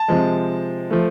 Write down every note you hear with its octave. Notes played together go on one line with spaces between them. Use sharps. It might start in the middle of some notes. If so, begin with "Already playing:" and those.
Already playing: A5
C3 F3 G#3
F3 A3